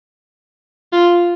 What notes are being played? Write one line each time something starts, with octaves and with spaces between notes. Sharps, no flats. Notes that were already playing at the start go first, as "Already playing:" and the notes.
F4